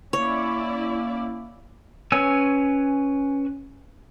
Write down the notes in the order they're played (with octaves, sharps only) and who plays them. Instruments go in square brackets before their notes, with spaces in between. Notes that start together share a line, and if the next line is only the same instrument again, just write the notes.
[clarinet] A#3 [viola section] C#4 E4 D5 [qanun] C#5
[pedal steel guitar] C#4 B4 C#5 G#5 E6